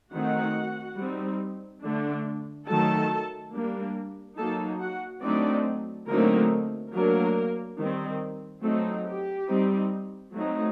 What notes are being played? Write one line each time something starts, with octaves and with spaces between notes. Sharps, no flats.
D#3 A3 C4 D#4 F#4 F#5
G3 C4 D#4
D3 A3 D4
D#3 F#3 A3 A4 A5
G3 A#3 D4
F#3 A#3 D#4 A4 A5
F#4 F#5
F#3 A3 C4 D4 D#4 D5
D3 F#3 A3 A#3 C4 D#4 A#4
F#3 A3 A#3 D4 A#4
D#3 G3 C4
F#3 A3 C4 D#4 A4
G4
G3 C4 D#4
F#3 A3 C4 D#4